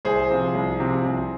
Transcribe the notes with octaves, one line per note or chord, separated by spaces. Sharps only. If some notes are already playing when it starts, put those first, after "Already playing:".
C2 G#4 C5
C3 F3 C4
C2
C3 F3 C4
C2